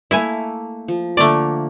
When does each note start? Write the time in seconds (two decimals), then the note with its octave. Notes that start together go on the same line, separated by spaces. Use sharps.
0.11 A3 A#3 E4 E5 G#5
0.88 F3
1.17 D3 A3 A#3 D5